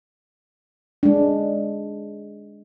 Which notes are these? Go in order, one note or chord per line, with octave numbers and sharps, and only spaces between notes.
G#3 D4